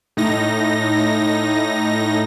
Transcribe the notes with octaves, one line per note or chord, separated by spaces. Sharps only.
A2 D#4 A#6